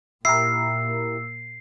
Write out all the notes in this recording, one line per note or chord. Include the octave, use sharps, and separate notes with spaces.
A#2 A#3 E4 G4 A#4 E6 C7